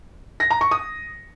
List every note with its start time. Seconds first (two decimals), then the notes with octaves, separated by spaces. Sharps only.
0.40 A#6
0.51 A#5
0.61 C#6
0.71 D#6